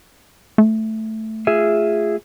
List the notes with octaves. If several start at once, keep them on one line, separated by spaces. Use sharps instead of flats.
A3
F4 G#4 E5